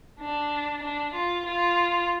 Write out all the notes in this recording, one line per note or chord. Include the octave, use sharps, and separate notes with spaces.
D4
D4
F4
F4